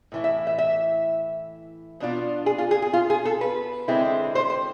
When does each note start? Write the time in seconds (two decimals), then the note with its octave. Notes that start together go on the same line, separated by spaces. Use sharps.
0.12 A2 E3 E4
0.24 E5
0.47 E5
0.58 E5
2.00 B2 B3 D4 F4
2.46 G#4
2.58 F4
2.71 G#4
2.82 G#4
2.93 F4
3.10 G#4
3.25 A4
3.41 B4
3.88 D3 G#3 C4 E4
4.35 C5
4.50 C5